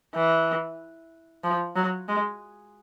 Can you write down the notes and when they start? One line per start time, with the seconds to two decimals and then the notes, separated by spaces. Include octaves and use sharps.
0.15 E3
1.44 F3
1.76 F#3
2.08 G#3